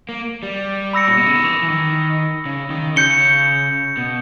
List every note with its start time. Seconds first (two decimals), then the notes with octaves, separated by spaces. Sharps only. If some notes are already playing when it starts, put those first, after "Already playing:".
0.09 A#3
0.43 G3
0.93 B5 E6 A#6 C#7
1.08 A#2
1.17 B2
1.26 C#3
1.35 D#3
1.44 E3
1.63 E3
1.70 D#3
2.45 C#3
2.71 D#3
2.96 C#3 G6 C#7 G7
3.97 B2